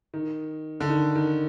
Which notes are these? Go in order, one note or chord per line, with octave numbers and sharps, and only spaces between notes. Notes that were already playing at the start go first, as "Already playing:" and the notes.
D#3
D3
D#3
D#3